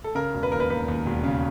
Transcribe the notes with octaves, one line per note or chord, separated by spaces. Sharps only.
A4
C#3 A#4
E1
B4
D#2 A#4
B4
D#2 B4
D#2
E1
C#3